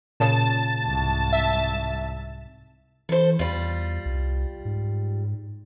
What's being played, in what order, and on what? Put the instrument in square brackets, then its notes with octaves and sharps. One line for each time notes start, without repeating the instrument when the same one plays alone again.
[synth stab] A#2 C#3 [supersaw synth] A5
[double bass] C2 G#2
[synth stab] E5
[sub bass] E3 [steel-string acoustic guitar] A4 C5
[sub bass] E2 [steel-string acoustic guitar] G3 F4
[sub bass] C2
G#2